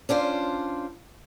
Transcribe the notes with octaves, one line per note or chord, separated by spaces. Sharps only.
C#4 D4 F4 C5